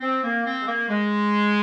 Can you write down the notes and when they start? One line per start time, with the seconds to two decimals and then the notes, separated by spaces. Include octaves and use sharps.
0.01 C4
0.23 A#3
0.45 C4
0.61 G#3
0.67 A#3
0.89 G#3